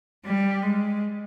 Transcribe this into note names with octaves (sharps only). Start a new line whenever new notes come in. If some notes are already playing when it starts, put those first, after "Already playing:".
G3
G#3